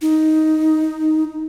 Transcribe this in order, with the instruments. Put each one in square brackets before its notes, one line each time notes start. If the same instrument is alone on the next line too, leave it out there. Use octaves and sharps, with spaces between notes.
[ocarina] D#4